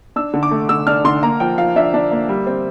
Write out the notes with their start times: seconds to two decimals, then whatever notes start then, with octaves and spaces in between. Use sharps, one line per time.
0.16 D4 E6
0.34 D3
0.43 D6
0.51 A3
0.69 D3 E6
0.87 D4 F6
1.05 D3 C6
1.23 A#3 A#5
1.40 F3 G5
1.58 F3 F5
1.76 D4 E5
1.94 D4
2.11 A#3
2.29 G3
2.47 C4